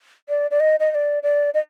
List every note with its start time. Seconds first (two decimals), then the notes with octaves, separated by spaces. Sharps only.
0.29 D5
0.51 D5
0.60 D#5
0.80 D#5
0.91 D#5
0.95 D5
1.23 D5
1.54 D#5